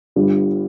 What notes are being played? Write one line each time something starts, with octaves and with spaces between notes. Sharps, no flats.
G1 G2 G3